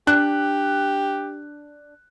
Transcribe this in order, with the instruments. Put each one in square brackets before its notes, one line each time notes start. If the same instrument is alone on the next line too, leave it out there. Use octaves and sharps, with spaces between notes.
[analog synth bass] D4 [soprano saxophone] G4 [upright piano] F#6